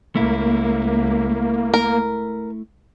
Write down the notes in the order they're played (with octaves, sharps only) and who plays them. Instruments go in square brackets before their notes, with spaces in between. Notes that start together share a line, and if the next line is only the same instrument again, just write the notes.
[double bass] C#2 [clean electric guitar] A3 E4 [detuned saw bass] A#3
[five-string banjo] A#4